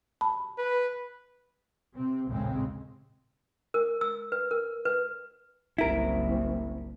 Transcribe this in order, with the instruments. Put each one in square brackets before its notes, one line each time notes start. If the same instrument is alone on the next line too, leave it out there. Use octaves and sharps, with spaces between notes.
[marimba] A5 B5
[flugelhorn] B4
[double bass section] C3 C4
A#1 D#2 A2 C#3 G#3 C4
[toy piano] A#4
E6
B4
A#4
B4
[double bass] F#1 C2 [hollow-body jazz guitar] E4 A#4